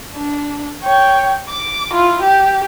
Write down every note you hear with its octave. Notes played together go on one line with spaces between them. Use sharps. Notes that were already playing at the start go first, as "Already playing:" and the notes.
D4
C#5 G5
D6
E4 F4
G4